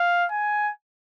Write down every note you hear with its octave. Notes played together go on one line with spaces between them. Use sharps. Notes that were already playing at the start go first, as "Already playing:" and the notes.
Already playing: F5
G#5